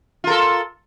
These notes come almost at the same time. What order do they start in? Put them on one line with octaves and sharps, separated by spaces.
F4 A#4 A4